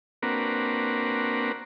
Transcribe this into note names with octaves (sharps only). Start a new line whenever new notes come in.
A#3 C4 D4 F#4 A#4 B4